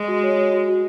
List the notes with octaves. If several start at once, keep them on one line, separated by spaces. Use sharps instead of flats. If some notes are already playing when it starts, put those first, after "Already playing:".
Already playing: G#3
F#4
C#5
F#4
F#4
F#4